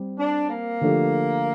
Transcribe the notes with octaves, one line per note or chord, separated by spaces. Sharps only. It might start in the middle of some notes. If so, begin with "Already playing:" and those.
Already playing: G3 C4 G4
D4
A#3
D3 F3 A3 D4 G4